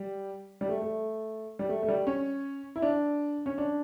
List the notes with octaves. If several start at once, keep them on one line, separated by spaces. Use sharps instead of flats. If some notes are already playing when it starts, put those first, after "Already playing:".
Already playing: G3
G3
A3
A3
G3
A3
A3
G3
C#4
E4
D4
C#4
D4